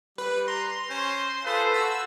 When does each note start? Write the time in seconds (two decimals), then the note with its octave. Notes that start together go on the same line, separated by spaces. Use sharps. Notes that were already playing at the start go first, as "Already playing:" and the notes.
0.18 G3 B4
0.48 A#5 C6
0.90 C#4 C5
1.45 F4 G#4 A4 B4 C5
1.74 F#4 E6